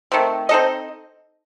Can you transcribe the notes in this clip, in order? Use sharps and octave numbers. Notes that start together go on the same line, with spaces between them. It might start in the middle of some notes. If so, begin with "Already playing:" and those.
D#3 A3 C4
C4 D#4 A4 D#5